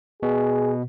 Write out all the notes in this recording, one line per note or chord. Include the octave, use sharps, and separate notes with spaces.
B2 G#4